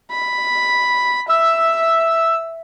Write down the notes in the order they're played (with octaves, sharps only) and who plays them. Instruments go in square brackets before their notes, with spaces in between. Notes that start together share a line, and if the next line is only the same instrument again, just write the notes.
[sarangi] B5
[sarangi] E5 [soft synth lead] E6